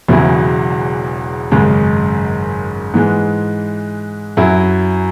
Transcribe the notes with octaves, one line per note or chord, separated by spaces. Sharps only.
E1 E2 C#3 F#3 E4
G#1 F#2 C#3 G#3
G#2 E3 G#3
F#2 F#3 E4